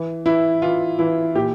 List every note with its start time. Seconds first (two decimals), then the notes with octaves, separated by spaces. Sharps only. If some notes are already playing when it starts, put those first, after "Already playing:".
Already playing: E3
0.25 E3 E4
0.62 E3 F4
0.99 E3 E4
1.35 A#2 G4